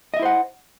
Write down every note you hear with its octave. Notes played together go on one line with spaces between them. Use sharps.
E4 C5 D#5 E5 F#5